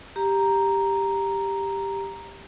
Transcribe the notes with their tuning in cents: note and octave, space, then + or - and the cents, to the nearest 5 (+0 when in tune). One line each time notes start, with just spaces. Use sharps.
G4 +5 A#5 +0